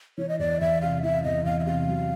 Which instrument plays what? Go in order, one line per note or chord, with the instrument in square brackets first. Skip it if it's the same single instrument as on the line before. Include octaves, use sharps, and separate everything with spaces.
[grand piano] E3 [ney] C#5
[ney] D#5
[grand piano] E2 [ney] D5
[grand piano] E2 [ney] E5
[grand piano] C3 [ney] F5
[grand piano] E3 [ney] E5
[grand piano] E2 [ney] D#5
[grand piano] E2 [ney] F5
[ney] E5
[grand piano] C3 [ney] F5
[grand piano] F#3